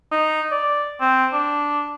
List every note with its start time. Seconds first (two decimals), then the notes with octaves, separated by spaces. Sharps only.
0.12 D#4
0.51 D5
1.01 C4
1.33 D4